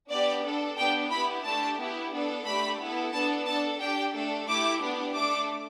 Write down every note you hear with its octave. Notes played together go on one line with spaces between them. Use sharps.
B3 D4 G4 D5
D4 A4
B3 D4 G4 G5
B3 E4 G4 B5
A3 D4 G4 A5
B3 E4 G4
B3 D4 A4
A3 D4 G4 B5
B3 E4 A4
B3 D4 A4 A5
D4 A4 A5
D4 G4 G5
A3 D4 A4
A3 E4 G4 D6
B3 D4 G4
A3 D4 A4 D6